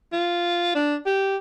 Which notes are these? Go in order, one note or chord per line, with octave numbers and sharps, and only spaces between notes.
F4
D4
G4